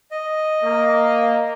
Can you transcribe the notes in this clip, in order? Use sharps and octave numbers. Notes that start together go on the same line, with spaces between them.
D#5
A#3